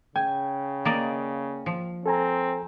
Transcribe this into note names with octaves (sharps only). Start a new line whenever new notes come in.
C#3 G5 G#5
A#3 D5 D#5
F3
C4 A4 G#5 A#5